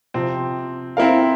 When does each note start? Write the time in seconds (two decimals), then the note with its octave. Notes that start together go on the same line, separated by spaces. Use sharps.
0.14 C3 F3 C4
0.97 C4 E4 A#4 F5